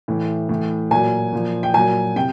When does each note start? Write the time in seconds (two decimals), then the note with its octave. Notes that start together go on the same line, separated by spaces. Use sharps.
0.08 A2 E3
0.49 A2 E3
0.91 A#2 F#3 G#5
1.33 A#2 F3
1.63 G5
1.74 A#2 F#3 G#5
2.16 C3 G5